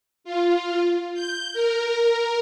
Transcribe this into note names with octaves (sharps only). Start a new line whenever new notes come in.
F4
G6
A#4